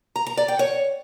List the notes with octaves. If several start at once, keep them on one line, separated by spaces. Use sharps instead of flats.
A#5
A#5
D5
G5
C#5